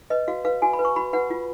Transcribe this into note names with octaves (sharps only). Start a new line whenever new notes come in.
B4 D#5
F#4 F5
B4 F5
F#4 G#5
B5
B4
C#6
F#4 B5
B4 F#5
F4